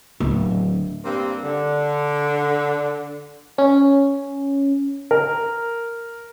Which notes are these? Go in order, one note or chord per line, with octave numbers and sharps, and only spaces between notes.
D1 D4
G2 A#3 C4
D3
C#4
A#4